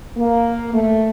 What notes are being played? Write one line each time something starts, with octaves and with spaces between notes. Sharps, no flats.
A#3
A3